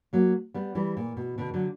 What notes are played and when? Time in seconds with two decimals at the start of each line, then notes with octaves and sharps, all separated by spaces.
0.13 F#3 A#3
0.54 G3 B3
0.75 E3 G3
0.97 A#2
1.17 B2
1.38 B2 D3
1.54 D3 F#3